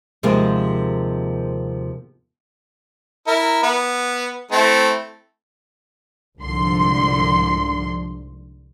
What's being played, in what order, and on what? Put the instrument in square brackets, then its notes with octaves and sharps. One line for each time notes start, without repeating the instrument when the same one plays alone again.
[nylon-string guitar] D#2 C3 F3 G#3 A#3 C4
[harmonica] E4 A#4
B3
A3 C4 E4
[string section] C2 G#2 D3 F3 C6